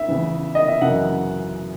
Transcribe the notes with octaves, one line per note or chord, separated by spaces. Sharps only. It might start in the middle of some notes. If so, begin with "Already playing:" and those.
Already playing: E5
E2 C#3 E3
D#5
E5
F#2 C#3 E3 F#5